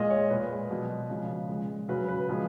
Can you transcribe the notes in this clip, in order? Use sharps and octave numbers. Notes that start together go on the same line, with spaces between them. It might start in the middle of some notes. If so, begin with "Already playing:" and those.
Already playing: A#2 G#3 D#5
C#5
A#2 G#3 B4
B2 F#3
C#3 F3 G#3
A#2 G#3
C#3 F#3 B4
B4
A#2 F3 G#3